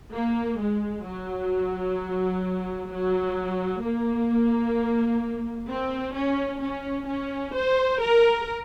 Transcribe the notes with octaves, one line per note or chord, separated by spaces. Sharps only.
A#3
G#3
F#3
F#3
A#3
C4
C#4
C#4
C#4
C5
A#4